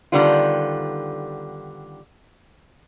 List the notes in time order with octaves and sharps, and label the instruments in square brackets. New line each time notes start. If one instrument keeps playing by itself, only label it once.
[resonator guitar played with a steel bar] D3 D#3 G3 B3 F4